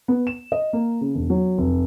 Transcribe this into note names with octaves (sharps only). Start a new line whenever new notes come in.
B3
E7
D#5
A#3
C#3
E1
F#3
F1